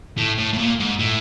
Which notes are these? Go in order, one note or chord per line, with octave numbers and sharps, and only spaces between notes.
A2
A2
A2
A#2
G#2
A2